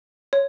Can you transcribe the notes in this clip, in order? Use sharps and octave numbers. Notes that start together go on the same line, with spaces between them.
C#5